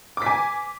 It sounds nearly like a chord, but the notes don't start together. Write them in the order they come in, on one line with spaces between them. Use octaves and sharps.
D6 B6 G#5